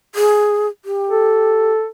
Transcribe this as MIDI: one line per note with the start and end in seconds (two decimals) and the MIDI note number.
0.15 0.67 68
0.85 1.72 67
1.10 1.86 69